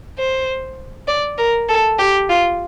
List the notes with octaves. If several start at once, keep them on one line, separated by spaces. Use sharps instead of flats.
C5
D5
A#4
A4
G4
F4